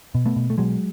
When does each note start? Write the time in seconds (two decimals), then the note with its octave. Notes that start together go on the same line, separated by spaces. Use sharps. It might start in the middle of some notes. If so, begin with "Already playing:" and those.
0.15 B2
0.26 A3 B3
0.36 B2
0.50 A3
0.58 B2 F#3 G#3